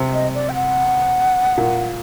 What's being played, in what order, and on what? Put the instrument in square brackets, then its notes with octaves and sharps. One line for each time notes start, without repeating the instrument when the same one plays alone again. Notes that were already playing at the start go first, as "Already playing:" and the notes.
Already playing: [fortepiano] C3
[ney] D#5
D5
G5
F#5
[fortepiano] A#2